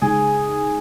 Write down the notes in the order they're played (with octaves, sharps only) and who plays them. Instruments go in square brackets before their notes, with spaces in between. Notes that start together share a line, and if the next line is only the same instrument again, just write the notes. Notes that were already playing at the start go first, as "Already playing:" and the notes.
[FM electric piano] C#3 G#3 D#4 [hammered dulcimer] G#4